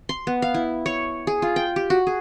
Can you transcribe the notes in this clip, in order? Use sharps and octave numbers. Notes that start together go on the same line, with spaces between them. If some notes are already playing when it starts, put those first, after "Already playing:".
C6
B3
F5
E4
C#5
G#4
F4
G5
G4
F#4
G#4